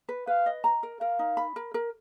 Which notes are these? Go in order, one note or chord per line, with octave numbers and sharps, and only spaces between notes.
B4
B4 F5
D#5
A#5
A#4
A#4 F5
D#4
B5
A#4
A#4